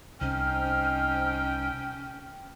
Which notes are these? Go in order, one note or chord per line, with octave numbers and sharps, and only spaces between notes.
C2 C#4 D#4 C5 G5 F6